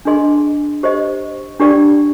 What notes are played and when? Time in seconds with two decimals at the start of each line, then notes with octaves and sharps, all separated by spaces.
0.05 D4 G#4 D#5 G#5 C6
0.83 G4 C5 D#5
1.60 D4 G4 D5 G5